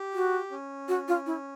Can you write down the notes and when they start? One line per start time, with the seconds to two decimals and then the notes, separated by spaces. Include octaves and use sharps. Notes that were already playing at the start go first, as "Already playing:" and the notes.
Already playing: G4
0.14 F#4
0.51 C#4
0.88 F#4
1.08 F4
1.26 E4